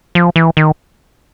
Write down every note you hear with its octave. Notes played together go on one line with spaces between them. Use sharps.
F3
E3
D#3